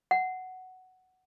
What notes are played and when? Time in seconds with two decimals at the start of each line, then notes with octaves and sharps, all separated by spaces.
0.11 F#5